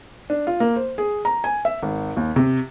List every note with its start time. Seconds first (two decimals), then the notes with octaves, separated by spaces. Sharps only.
0.30 D4
0.47 F4
0.60 A#3
0.76 C5
0.98 G#4
1.25 A#5
1.44 G#5
1.65 E5
1.83 G#1
2.17 D#2
2.36 C3